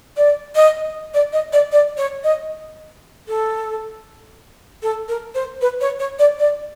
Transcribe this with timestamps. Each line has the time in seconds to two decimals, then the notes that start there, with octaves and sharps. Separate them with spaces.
0.17 D5
0.55 D#5
1.14 D5
1.33 D#5
1.53 D5
1.72 D5
1.97 C#5
2.24 D#5
3.28 A4
4.83 A4
5.08 A#4
5.35 C5
5.61 B4
5.81 C#5
5.99 C#5
6.19 D5
6.39 D5